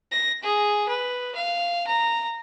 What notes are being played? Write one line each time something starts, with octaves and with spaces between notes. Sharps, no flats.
A#6
G#4
B4
F5
A#5